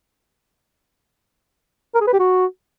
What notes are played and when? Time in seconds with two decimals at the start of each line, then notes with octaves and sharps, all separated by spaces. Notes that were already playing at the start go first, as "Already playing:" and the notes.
1.95 A#4
2.01 G#4
2.07 B4
2.13 G4
2.19 F#4